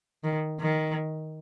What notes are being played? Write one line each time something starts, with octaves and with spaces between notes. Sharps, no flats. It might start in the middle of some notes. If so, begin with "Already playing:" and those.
D#3
D#3